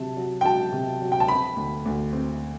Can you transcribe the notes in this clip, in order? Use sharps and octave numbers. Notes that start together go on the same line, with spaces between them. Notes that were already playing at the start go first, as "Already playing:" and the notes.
Already playing: C3 F#3 A5
F#3
G5
F#3 A5
C3
F#3
G5
A5
C4 B5
D2
D2
C4